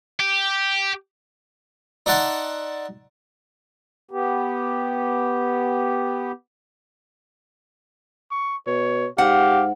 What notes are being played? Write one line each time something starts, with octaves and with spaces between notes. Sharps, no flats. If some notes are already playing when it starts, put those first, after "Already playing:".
G4
D#4 D5 E5 F#5 A5 C6
B3 G4
C#6
B2 C#5
G#2 G4 F5 F#5